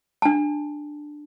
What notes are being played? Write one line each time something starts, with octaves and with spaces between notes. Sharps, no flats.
D4 A5